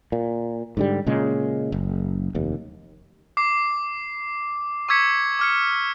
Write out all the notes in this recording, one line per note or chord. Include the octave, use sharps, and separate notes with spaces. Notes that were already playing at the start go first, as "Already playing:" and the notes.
A#2
G#2 D3 G3
A#2 C#3 G#3
F#1
F1 D#2
D6 C7
C#6 D6 E6 G#6 B6 C#7
D6 F6 C#7